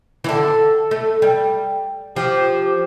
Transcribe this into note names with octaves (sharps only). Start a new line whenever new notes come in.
E3
D3 A4
A3
G3
F3 G4